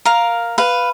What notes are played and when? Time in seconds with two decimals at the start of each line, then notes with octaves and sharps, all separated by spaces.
0.05 A#4 F5
0.58 B4 F5